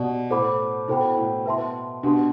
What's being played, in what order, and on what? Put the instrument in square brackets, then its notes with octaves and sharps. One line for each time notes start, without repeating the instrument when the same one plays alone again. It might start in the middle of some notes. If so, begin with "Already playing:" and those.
Already playing: [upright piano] B2 [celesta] G4 D5 F#5
[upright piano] A2 [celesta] A4 C5 F#5 B5 D6
[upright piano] B2 [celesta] E4 A4 C5 G5 B5
[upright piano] A2
[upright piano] B2 [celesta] B4 E5 A5 C6
[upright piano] B2 [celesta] D4 G4 B4 F#5 C6